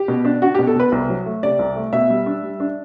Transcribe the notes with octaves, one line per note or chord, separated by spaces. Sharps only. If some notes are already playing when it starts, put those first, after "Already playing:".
Already playing: G4
B2
D4
D4 F#4
G4
B2
A4
B2 B4
C2
F#3
A3
C3 D5
C2
A3
B2 E5
G3
D4
G3
D4